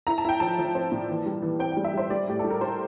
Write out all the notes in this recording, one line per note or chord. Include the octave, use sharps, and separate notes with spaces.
E4 A#5
A5
E4 G5
F3 A5
F3
C4
A#2
E3
G3
E3
C4 G5
G3 G5
E5
G3 C5
G3 D5
A2 G4
G3 A4
A#4
G3 C5